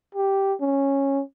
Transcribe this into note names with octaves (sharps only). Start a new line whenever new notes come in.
G4
C#4